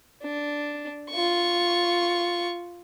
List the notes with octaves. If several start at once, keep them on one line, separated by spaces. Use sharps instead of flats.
D4
F4 C#6